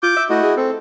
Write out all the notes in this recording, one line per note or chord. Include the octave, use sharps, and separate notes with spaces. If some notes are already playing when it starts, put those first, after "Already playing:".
F4 D6 G6
E5
A3 E4 F#4 D#5
G#4
C4 A4